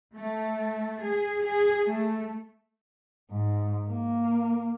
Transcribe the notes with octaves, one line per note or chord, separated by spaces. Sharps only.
A3
G#4
G#4
A3
G#2
A#3